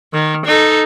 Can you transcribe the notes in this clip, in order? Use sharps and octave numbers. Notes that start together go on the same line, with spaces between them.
D#3
D#4 A4